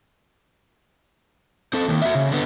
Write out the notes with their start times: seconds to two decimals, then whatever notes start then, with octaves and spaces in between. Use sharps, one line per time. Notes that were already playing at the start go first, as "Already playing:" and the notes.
1.74 C4 A4
1.88 D#2 D#3
2.02 F#4 E5
2.15 C#3
2.30 D3 B3